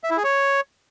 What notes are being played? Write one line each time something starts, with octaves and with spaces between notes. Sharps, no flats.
E5
E4
G#4
C#5